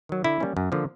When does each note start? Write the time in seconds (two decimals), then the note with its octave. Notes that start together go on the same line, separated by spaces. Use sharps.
0.09 D#3 F#3
0.24 D3 E4
0.40 G3 A#3 C#4
0.57 F#2
0.72 D3 F3 A#3